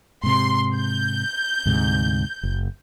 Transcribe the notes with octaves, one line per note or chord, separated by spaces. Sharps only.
G#2 C3 C6
G6
D2 G#2 C3
F#1